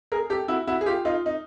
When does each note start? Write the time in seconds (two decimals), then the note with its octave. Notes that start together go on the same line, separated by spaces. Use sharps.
0.12 G#4 A#4
0.30 G4 A4
0.48 E4 F#4
0.67 E4 F#4
0.81 G#4
0.86 F4 G4
1.05 D#4 F4
1.26 D#4